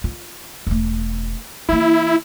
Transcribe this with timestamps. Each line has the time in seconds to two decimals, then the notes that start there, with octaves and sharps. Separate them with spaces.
0.04 F4
0.67 E1 A3
1.69 E3 A#3 E4